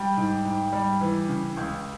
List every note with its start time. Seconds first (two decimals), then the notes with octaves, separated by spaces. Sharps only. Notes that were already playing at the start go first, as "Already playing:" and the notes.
Already playing: G3 G5
0.17 G#2
0.45 G#2
0.73 G3
1.01 E3
1.28 C#3
1.57 C#2